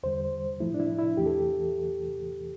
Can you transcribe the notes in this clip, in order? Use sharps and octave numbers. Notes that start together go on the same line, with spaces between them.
E2 D3 G3 C5
A2 F3 A3 E4
D4
E4
E4
E2 E3 A3 G4
A4
G4